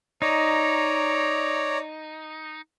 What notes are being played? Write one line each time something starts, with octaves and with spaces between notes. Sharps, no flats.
D#4 C#5 D5 A#5